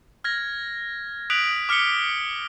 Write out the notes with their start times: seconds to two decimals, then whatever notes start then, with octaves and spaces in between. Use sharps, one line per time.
0.24 F6 G#6 A#6
1.30 D#6 F#6 B6 D7 F7 F#7
1.69 D6 F6 B6 C#7 G7